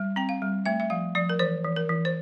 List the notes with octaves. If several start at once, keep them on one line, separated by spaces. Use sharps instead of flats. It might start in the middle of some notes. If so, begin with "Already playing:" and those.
Already playing: G3
C4 G5
F5
G3
A3 E5
E5
F3 F5
F3 D5
A#4
E3 C5
E3
A#4
E3
C5